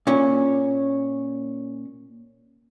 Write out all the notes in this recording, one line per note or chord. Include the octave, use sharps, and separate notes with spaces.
A#2 C#4